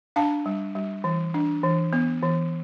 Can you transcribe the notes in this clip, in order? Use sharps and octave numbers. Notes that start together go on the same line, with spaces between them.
D4 F5 A5
G3
G3
E3
D4
E3
B3
E3